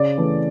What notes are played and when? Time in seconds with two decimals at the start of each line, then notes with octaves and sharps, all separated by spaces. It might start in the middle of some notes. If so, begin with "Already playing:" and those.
Already playing: C#3 D5
0.18 E3 A3